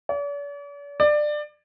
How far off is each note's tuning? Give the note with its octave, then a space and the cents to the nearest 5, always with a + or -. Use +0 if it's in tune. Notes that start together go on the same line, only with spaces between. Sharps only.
D5 -45
D5 +20